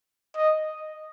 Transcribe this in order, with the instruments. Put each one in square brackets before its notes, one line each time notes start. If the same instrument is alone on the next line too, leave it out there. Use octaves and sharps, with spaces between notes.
[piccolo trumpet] D#5